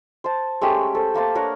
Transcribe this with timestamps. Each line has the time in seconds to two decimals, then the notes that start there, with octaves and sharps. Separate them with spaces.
0.24 C5 A5
0.61 G#3 A3 C#4 G4
0.95 A4 C5
1.14 A3 A#3 C5 A5
1.35 D4 A#4 C#5 F#5